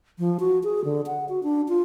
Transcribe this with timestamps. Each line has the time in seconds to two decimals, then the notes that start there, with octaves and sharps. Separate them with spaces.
0.19 F3
0.40 F#4
0.64 G#4
0.84 D3
1.06 F#5
1.29 F#4
1.43 D4
1.68 F4